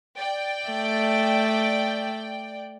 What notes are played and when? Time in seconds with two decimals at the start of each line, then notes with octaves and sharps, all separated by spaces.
0.16 D5 G5
0.68 A3